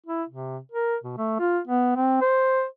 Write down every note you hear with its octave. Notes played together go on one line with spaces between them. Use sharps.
E4
C3
A#4
B2
A3
F4
B3
C4
C5